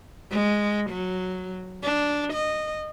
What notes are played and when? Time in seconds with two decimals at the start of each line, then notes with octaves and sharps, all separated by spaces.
0.31 G#3
0.90 F#3
1.83 D4
2.33 D#5